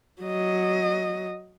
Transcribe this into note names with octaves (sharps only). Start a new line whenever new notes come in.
F#3 D#5